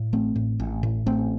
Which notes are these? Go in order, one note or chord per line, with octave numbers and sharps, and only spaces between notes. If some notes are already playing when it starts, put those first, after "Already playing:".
Already playing: A2
A1 A3 C4
A2
A1
A2
A1 A3 C4